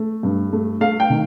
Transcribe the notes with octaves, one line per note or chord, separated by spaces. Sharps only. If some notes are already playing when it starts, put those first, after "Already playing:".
Already playing: A3
G2
A3
A3 F5
G5
D#3